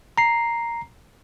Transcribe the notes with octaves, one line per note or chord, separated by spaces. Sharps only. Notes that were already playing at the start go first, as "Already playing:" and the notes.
A#5 C7